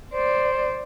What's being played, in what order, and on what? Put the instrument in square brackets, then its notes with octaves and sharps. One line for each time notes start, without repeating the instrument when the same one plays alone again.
[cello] C5 D5